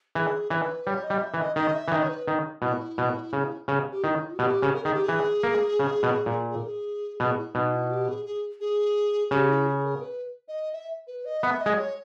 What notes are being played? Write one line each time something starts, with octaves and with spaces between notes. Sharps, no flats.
E3 G#4
E3 B4 C#5
G3 C#5
D#5
G3
E5
E3
D#5
D#3 D#5
E5
E3
D#3 D#5
C#5
B4
D#3
B2 E4
B2
C#3
C#3
G4
D#3 E4
B2 G4
C#3
A#4
D#3 G#4
G4
E3 G#4
A#3
C#3
B2
A#2
G#4
A#4
G#4
B2 G#4
E4
B2 D#4
E4
G4
G#4
G#4
G#4
C#3 G4
E4
G#4
A#4
B4
D#5
E5
B4
D#5
B3 E5
D#5
G#3
C#5